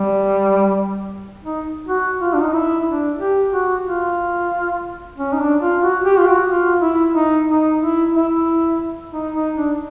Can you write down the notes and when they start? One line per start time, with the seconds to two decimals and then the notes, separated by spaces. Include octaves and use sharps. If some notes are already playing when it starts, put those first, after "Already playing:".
Already playing: G3
1.45 D#4
1.88 F#4
2.21 F4
2.34 D4
2.43 D#4
2.54 E4
2.87 D4
3.20 G4
3.52 F#4
3.86 F4
5.17 C#4
5.33 D#4
5.40 D4
5.62 F4
5.83 F#4
6.05 G4
6.18 F4
6.28 F#4
6.49 F4
6.82 E4
7.14 D#4
7.47 D#4
7.81 E4
8.14 E4
9.13 D#4
9.34 D#4
9.56 D4